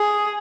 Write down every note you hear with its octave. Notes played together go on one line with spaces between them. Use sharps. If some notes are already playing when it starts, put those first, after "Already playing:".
Already playing: G#4